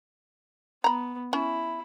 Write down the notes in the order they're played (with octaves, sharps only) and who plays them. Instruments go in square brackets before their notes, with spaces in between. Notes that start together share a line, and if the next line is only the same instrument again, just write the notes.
[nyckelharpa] B3 [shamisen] A#5 B5
[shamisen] C#4 [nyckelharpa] E4